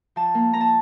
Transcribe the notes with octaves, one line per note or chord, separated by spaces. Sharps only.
F3 A5
A#3
A#3 A#5
A5